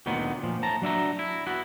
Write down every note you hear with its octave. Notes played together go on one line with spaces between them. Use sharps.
D2 A#2 D#3 F#3 B3
A#2 F3
A2 A5 A#5
F#3 D4 E5 A#5
E4
B3 E4 F#4